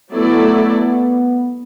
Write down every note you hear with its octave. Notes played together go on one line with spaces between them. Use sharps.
F#3 A3 B3 E4 A4 D5